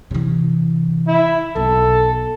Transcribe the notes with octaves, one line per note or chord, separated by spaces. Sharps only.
C3 E3
E4
B1 A4